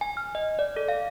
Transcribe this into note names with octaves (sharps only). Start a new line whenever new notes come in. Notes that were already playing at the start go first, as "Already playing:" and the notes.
G#5
F6
D#5
D5
A4
F5